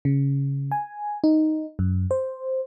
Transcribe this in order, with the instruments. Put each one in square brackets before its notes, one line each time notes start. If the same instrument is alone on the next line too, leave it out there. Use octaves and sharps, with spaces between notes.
[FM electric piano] C#3
G#5
D#4
F#2
C5